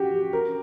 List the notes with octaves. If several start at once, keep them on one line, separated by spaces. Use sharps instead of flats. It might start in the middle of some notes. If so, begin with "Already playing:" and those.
Already playing: F#4 G4
A#4